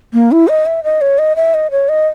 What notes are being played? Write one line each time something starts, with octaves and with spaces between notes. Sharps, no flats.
A#3
E4
D#5
E5
D#5
C#5
D#5
E5
D#5
C#5
D#5